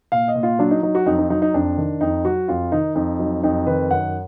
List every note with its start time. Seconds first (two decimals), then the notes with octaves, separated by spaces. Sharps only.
0.12 A#2 F5
0.28 D#5
0.35 A#2
0.43 F4
0.59 F#3 D4
0.71 D#4
0.83 F#3 D#4
0.95 F#4
1.06 F2 D#4
1.18 D#4
1.30 F#3 D#4
1.42 D#4
1.54 F2 D4
1.77 D#3
2.01 F2 D#4
2.25 F#3 F#4
2.48 F2 F4
2.72 D#3 D#4
2.95 F2 D#4
3.19 F#3 D#4
3.43 F2 D#4
3.66 D#3 B4
3.91 F#2 F#5